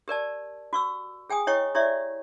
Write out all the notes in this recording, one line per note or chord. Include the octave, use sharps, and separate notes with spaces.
G4 A#4 D5 A5
F#4 C#6 E6
G#4 G5 G#5 D#6
E4 C#5 D#5 G5 C#6
E4 G4 C#5 D5 E5